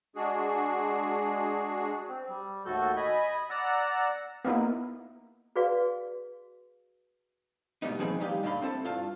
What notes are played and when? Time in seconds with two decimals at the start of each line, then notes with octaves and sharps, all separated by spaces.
0.16 G#3 D4 F#4 G#4
2.08 C4
2.29 G3
2.66 D#2 A2 F#4 A4 G6
2.97 D#5 G#5 B5
3.50 D5 F#5 A#5 E6
4.45 A#3 B3 D#4 E4
5.56 F#4 G#4 B4 D5 F5
7.82 G#2 B2 F3 G3 B3 D#4
7.99 D#3 F3 C4 D#4 G#4 B4
8.20 G3 D#4 G4 F5
8.43 G2 D3 D#5 F5 B5
8.62 C4 E4 A4
8.85 G2 F4 A5